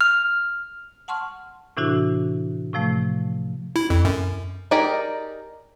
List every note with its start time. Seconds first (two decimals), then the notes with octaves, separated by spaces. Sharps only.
0.01 F6
1.08 F#5 A5 C6 C#6 F6
1.77 A2 C3 E3 D4 E4 F#4
2.73 A2 C3 F3 A3
3.76 E4
3.90 F2
4.05 F#2
4.71 D#4 G4 G#4 A#4 D5